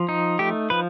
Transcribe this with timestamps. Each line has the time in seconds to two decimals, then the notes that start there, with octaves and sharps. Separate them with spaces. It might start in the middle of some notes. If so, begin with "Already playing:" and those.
Already playing: F3
0.09 D#4
0.39 A3 G4
0.70 F3 B4